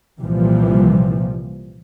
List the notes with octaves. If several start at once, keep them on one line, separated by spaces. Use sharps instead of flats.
C2 A#2 E3 F3 G3